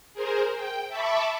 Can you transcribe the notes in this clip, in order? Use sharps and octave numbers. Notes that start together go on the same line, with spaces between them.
G#4 A#4 C5
G5
E5 A5 B5 C#6 D6